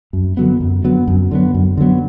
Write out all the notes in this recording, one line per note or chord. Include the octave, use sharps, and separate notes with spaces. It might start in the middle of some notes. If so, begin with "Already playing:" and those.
F#2
D3 F#3 B3
F#2
D3 F#3 B3
F#2
D3 F#3 B3
F#2
D3 F#3 B3